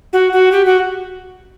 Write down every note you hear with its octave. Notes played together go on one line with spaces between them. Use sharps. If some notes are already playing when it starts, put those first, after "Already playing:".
F#4
F#4
G4
F#4